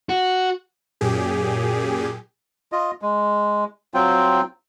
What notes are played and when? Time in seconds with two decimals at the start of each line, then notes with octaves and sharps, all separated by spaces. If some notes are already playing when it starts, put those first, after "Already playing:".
0.09 F#4
1.01 F#2 A#2 G4 G#4
2.72 F4 D#5
3.02 G#3
3.94 F#3 C4 F4 G5